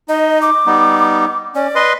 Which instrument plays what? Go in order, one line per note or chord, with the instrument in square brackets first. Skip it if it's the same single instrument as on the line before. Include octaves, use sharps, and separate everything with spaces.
[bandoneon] D#4 [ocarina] D#5
[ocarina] D6
[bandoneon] G3 B3 D#4
[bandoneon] C#4 [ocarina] D5
[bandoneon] B4 D#5 C6